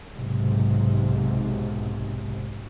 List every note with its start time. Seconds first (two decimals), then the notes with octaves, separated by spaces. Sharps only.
0.16 B1 G#2 C3